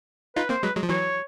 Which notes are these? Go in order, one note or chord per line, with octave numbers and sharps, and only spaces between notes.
D#4 F4 B4
A#3 C4 C5
F#3 G#3 B4
F#3 G#3
F3
E3 F#3 C#5